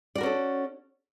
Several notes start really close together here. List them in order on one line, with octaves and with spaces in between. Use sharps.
D5 F#4 A#4 C#4 A4